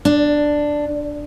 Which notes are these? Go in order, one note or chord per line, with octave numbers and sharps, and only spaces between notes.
D4